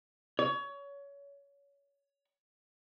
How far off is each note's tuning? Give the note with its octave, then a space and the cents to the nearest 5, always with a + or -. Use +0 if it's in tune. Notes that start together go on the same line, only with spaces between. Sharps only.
C#5 +25